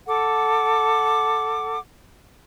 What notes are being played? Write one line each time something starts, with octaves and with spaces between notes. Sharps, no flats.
A4 F#5 D6